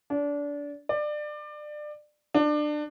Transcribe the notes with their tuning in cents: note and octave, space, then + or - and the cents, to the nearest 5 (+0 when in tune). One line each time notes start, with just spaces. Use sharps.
D4 -25
D5 +25
D4 +25